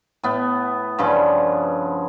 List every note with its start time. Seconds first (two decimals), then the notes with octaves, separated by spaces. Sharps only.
0.23 A2 B3
0.98 G2 C#3 F3 D6